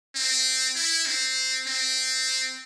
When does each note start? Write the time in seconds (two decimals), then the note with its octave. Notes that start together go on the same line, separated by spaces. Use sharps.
0.15 C4
0.76 E4
1.06 C4
1.67 C4